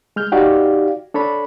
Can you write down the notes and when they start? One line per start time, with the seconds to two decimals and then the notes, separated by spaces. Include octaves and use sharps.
0.16 G#3 F6 G6
0.32 D#4 F#4 G4 D5 F5
1.14 D4 A4 C#5 B5